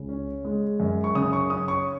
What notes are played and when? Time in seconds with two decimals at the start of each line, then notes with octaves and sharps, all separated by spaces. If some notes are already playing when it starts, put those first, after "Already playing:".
Already playing: C#2 C#3
0.09 C#4
0.45 G#3
0.80 F#2
1.04 C#6
1.15 C#3 D#6
1.33 C#6
1.50 C#4 D#6
1.68 C#6